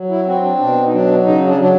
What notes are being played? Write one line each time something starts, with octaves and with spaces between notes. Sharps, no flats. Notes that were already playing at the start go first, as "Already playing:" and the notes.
Already playing: F#3
E4
C4 F#4
D4
B2 D4
D#4
F#3 D4
C#3 D#4
D4
F#3 D4